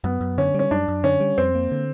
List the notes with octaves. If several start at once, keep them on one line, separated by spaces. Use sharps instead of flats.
F#2 B3
F#2
D3 C#4
G3 C#4
F#2 D4
F#2
D3 C#4
G3
F2 C4
A#3
D3